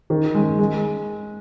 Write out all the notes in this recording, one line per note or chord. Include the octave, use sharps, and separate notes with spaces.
D#3
G#3
G#3